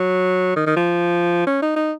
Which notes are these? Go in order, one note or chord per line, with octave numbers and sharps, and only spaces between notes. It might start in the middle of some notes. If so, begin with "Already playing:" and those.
Already playing: F#3
D#3
D#3
F3
C#4
D#4
D#4